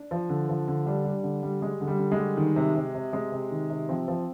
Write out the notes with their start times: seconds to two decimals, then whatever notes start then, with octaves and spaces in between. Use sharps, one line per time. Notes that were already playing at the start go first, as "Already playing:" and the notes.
Already playing: D4
0.11 F3
0.29 D3
0.49 F3
0.68 D3
0.86 G3 D4
1.05 G3
1.23 D3
1.43 G3
1.61 G3 G#3
1.81 D3
1.87 G3
1.99 D3
2.12 G#3
2.18 G3
2.37 D#3
2.56 C3
2.75 C3
2.94 C3
3.12 C3 G#3
3.32 C3
3.51 D#3
3.70 C3
3.89 F3 C4
4.08 F3